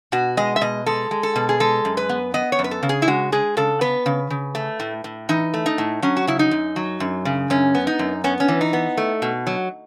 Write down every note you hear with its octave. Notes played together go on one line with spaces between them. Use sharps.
B2 F#4
G#3 D#5
E5
B2 D#5
G#3 A4
G#3
A4
B2
G#4
G#3 A4
F#2
B4
B3
B3 D#5
C#5
F#2
B4
A4
C#3
G#4
E4
G#3 F#4
G#3 G#4
C#3 A4
B3 B4
C#3
C#3
A3
A2
A2
E3 D#4
A3
D#4
A2
F#3 C#4
F#4
C#3 E4
D#4
F#2
F#3
F#2
C#3
F#2 C#4
B3
D#4
F#2
B3 C#4
C#4
E3
D#4
B3
A3
B2
F#3